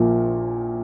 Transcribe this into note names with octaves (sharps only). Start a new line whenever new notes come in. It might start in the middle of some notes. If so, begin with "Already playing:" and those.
Already playing: A#1 A#2 F3 A#3